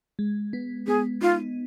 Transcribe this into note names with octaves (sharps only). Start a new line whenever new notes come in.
G#3
B3
B3 G#4
D#4 F4